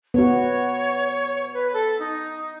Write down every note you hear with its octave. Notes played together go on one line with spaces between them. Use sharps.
B3 F#4 C#5
B4
A4
D#4